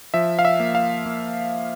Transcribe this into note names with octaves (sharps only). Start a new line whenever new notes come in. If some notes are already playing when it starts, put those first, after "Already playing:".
F3 E5
F5
E5
A#3
F5
A#3